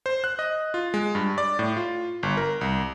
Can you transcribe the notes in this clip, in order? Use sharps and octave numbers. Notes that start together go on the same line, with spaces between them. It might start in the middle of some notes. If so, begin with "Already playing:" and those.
C5
F#6
D#5
F4
G#3
G2
D5
A2
F4
G1
A#4
C2